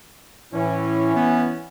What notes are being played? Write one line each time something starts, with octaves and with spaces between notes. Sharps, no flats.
A2 E3 C#4
B3